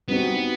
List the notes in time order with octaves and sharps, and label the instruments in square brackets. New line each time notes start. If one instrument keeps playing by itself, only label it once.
[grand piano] G3 C4 D#4 F#4 [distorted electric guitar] B3